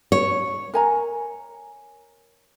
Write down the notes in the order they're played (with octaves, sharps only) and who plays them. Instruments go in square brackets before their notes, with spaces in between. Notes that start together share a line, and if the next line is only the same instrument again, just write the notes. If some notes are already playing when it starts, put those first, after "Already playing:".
[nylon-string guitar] C#5
[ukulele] A#4 G#5 A#5